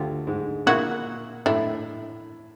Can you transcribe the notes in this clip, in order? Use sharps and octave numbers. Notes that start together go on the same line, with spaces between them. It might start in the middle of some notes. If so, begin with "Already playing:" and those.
Already playing: D2 D3 F4 G4
G#2 G#3
A#2 A#3 E4 F#4
A2 A3 D4 E4